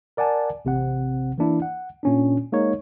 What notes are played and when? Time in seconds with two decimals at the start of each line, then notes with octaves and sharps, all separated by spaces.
0.17 A#4 D5 F#5 G#5 A5
0.65 A1 C3 C4 F#5
1.38 E3 A#3 D4 E4
1.62 F#5
2.03 A#2 C#4 D4
2.52 G#3 A#3 D#4 C#5